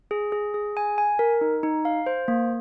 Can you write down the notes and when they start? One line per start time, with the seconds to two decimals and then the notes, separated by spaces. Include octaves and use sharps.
0.11 G#4
0.32 G#4
0.54 G#4
0.77 G#5
0.98 G#5
1.19 A#4
1.41 D#4
1.63 D#4
1.85 F5
2.06 C5
2.28 A#3